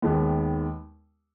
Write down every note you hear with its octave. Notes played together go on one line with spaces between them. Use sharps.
D#2 D#3 G#3 B3